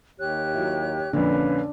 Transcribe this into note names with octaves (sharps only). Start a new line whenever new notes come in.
D#2 G4 C#5 F#6
F#3 E4
F2 A#2 D3 C#4 D4 B4 F5